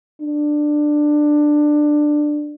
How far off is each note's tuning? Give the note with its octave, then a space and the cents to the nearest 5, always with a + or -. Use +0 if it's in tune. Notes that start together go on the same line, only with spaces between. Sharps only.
D4 +15